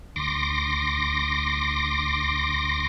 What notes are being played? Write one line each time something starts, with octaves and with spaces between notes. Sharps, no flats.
D2 C6 D6 A#6